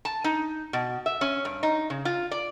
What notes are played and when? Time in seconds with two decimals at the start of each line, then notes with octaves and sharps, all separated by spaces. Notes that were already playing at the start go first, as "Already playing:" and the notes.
0.05 A5
0.24 D#4
0.73 B2
1.06 E5
1.21 C#4
1.45 G2
1.63 D#4
1.90 C#3
2.05 F4
2.31 D5